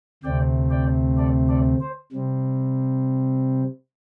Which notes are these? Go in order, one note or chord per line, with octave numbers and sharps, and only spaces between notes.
D2 C3 A3 C4 D5 G5
D5 G5
A4 D5
A4 D5
C5
C3 G3 C4